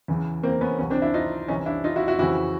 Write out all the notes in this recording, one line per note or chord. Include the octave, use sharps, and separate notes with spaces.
E2 C#3 E3
A#3 C4
B3 C#4
C#2 C3 E3 B3 C#4
C4 D4
D4 E4
D#4 F4
C2 C3 E3 C#4 D#4
D4 E4
D#4 F4
E4 F#4
E4 F#4
F2 C#3 E3 E4 F#4